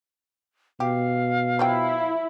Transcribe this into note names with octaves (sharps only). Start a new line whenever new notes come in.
B2 G4 F5
F3 F#3 E4 G5